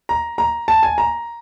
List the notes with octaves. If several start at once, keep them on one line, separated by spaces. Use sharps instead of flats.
A#5
A#5
A5
G#5
A#5